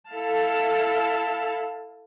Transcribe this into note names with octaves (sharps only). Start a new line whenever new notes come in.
E4 A4 F5 A5